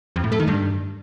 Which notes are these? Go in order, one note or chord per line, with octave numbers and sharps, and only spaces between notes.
F2
A2
A3
D#3
G2